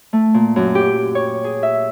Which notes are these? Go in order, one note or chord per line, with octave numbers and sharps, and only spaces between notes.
A3
A#2
F#2
G4
C#5
G#4
E5